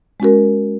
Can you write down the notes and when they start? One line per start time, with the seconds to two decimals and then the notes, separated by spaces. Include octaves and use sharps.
0.20 G#3 C#4 F#4 A#4